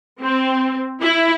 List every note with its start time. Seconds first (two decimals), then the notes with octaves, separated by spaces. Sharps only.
0.20 C4
1.01 E4